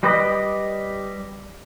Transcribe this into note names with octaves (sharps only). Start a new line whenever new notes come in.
G3 G4 B4 D5 D#5